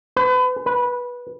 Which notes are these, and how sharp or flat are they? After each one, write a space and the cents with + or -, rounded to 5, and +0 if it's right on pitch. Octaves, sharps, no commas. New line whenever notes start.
B4 +35
B4 -15